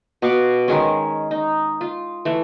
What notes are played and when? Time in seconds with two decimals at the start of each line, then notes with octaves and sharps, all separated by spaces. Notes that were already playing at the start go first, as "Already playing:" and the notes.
0.22 B2 F5 C#6 D6
0.68 D#3 G#3 C#4
1.31 D#4
1.81 F4
2.25 E3 A3